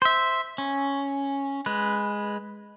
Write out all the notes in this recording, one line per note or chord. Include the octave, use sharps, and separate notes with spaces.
C5 E5
C#4
G#3 B4